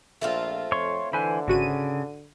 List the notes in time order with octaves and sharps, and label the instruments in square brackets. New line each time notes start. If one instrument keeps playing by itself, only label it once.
[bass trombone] A#1 [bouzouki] A3 C4 F4
[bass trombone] F2 [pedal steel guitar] C#5 C6 C#6
[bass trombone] D3 [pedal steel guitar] E3 C5 G#5 [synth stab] B4
[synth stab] G#1 F#4 D#7 [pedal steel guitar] C#3